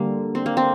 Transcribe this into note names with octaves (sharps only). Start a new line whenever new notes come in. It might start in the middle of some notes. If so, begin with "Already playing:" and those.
Already playing: D3 G3 A#3 D4 G4
C4
A#3
C4